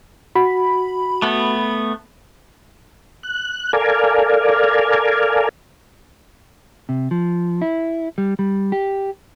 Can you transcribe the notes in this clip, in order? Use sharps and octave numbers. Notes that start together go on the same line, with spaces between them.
F#4 B5
A3 B3
F#6
A4 A#4 D5 F5 G#5
C3
F3
E4
G3
G3
G4